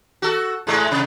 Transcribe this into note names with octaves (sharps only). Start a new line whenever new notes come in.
F#4 A4
G#2 G#3 A3
C3